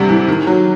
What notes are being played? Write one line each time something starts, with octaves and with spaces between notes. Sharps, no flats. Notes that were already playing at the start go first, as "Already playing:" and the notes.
Already playing: D2 C3 G3
E3
D#3
F#3